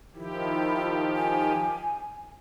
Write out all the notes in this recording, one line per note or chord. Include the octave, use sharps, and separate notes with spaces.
D#3 F3 E4 G4
G#5